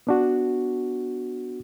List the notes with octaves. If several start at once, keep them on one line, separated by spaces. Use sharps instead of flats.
B3 D4 F#4